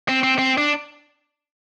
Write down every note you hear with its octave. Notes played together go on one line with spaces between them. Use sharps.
C4
C4
C4
D4